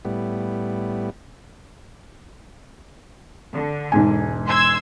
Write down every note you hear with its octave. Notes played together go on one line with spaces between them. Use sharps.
A2 G3 B3
D3
E1 G#2 G#5
C6 E6 G#6